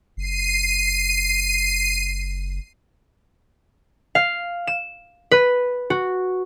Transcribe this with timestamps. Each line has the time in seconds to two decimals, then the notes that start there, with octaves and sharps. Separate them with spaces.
0.17 F#1 C7 D#7
4.15 F5
4.67 E7
5.31 B4
5.90 F#4